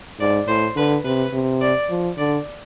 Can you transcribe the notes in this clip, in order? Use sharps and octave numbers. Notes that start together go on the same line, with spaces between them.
G#2 D5
A2 C5
D3 B4
C3 B4
C3
D5
F3
D3 D5